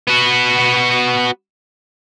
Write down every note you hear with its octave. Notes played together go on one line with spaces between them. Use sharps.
B3 F#4